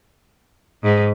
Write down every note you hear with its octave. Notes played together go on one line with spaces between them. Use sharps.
G#2